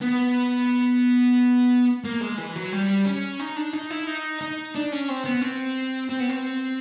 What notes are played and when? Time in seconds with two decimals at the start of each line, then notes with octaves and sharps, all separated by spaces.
0.02 B3
2.04 A#3
2.21 G#3
2.38 E3
2.56 F#3
2.72 G3
3.06 C#4
3.39 D#4
3.56 D4
3.73 D#4
3.90 E4
4.07 D#4
4.41 D#4
4.75 D4
4.92 C#4
5.09 C4
5.25 B3
5.42 C4
6.09 C4
6.20 B3
6.29 C4